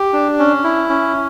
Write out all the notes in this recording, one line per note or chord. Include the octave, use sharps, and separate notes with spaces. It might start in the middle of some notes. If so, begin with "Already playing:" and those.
Already playing: G4
D4
C#4
E4
C#4